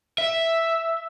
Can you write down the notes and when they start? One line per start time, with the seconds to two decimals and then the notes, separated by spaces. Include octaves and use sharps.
0.18 E5